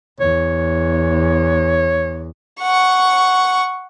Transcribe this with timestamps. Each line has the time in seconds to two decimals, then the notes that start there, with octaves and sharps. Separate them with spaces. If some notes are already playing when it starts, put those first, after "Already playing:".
0.20 E2 C#5
2.61 F#5 C#6